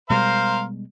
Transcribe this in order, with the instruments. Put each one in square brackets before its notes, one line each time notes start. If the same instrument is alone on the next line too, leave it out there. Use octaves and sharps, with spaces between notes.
[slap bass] B2 G3 G#3 [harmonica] A#4 C5 F5